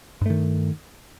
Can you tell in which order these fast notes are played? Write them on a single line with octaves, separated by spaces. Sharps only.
G2 A3 D#3